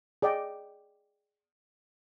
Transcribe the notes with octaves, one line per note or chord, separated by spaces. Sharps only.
G#4 D5 D#5 G5